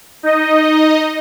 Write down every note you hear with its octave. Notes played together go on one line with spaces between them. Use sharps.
D#4 D#5